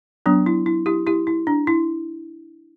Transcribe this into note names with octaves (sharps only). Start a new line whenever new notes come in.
F#3 B3 D4
E4
E4
E4 G4
E4 G4
E4
D4
E4